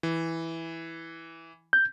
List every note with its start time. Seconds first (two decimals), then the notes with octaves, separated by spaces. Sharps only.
0.03 E3
1.73 G6